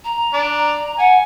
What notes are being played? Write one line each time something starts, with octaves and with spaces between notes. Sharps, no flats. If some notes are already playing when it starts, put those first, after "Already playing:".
A#5
D4
F#5 G#5